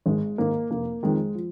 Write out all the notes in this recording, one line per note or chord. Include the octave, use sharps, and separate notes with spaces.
G#1 G#3
G#2 D#3 A#3
F1 A#3
F2 D#3 G#3
F3